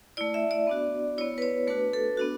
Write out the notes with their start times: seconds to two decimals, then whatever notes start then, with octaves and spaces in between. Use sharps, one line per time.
0.17 A3 E4 D5
0.34 E5
0.51 D5
0.67 B3 D4 F#4
1.18 B3 E4 C#5
1.38 B4
1.42 C#5
1.67 A3 D4 F#4 B4
1.93 A4
2.17 B3 D4 F#4